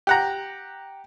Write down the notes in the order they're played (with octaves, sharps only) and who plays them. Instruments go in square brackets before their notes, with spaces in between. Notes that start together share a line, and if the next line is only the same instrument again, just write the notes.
[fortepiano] G4 F#5 A#5